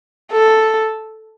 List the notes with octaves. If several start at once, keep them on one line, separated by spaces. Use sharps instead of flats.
A4